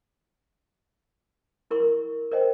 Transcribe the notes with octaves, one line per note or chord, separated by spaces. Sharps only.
E4 A#4 C6 C#6
A#4 C5 D#5 G5